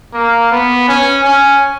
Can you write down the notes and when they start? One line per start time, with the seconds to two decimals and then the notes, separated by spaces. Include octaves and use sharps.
0.14 A#3
0.51 B3
0.88 C#4
1.24 C#4